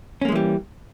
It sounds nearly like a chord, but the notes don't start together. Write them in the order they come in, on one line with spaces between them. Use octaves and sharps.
C#4 A#3 G#3 E3 G3